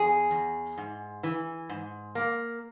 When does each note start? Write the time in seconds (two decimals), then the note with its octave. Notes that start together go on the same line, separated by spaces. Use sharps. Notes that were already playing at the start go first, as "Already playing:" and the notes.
Already playing: E2 G#4
0.31 E2
0.78 G#2
1.23 E3
1.69 G#2
2.15 A#3